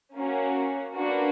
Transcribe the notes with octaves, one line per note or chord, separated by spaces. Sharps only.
A#3 C#4 F#4
A#3 D4 F#4 B4